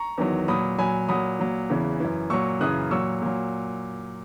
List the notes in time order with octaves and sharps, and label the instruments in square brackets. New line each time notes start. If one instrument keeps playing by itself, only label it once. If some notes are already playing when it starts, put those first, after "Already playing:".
Already playing: [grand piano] A#5 C#6
E2 D#3 F#3
A#2 F#3 B5 D#6
A#2 F#3 G#5 B5
A#2 F#3 B5 D#6
A#2 F#3
E2 C#3 E3
F#2 E3
A#2 F#3 C#6 E6
F#2 C#3 E3 D#6 F#6
A#2 F#3 C#6 E6
A#2 F#3